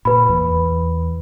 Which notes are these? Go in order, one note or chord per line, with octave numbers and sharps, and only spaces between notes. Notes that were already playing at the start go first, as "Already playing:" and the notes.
A#2 B4 B5
E2